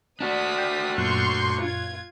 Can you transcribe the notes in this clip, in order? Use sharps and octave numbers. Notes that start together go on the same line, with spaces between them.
D4 F#4 D5 D#6 B6
G5
F#2 A#2 C6 C#6 F#6 G6
F4 G#6